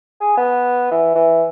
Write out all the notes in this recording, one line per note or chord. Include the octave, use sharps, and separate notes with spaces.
G#4
B3
E3
E3